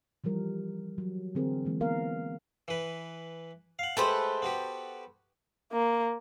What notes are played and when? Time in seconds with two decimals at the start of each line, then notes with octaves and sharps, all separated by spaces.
0.24 E3 F3 G3 A#4
0.98 F#3
1.35 D3 E3 C4 G#4 A#4
1.65 E3 G#3 A#3
1.80 A#3 B3 A#4 F5
2.68 E3 B4
3.79 F5 F#5
3.97 G#3 A3 G4 A4 B4 C5
4.42 B3 F#4 G4
5.72 A#3